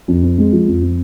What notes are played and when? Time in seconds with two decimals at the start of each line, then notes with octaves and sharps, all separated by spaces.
0.08 F2
0.23 C4
0.38 G#3
0.53 F3
0.68 F2
0.82 C4